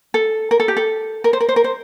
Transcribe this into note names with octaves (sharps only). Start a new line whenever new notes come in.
A4
A#4
A4
G4
A4
A#4
C5
A#4
C5
A#4
C5